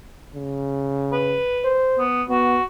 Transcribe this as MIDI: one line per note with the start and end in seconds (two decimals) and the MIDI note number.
0.35 1.40 49
1.13 1.73 71
1.65 2.04 72
1.99 2.23 59
2.29 2.58 59
2.29 2.64 66